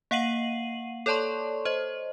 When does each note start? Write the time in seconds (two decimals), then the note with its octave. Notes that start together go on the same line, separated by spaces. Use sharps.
0.11 A#3 F5 F#5 C7 D#7 F#7
1.06 A4 C#5 D5 A5 C6 C#6
1.65 C5 D#5